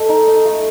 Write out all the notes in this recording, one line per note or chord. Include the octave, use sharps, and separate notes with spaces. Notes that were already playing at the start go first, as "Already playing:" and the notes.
Already playing: A3 A4 D#5
D#4
D#4
A3